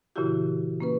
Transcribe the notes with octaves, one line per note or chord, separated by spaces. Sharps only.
A#2 C#3 E3 E4 F#4 G4
A#3 C#4 B4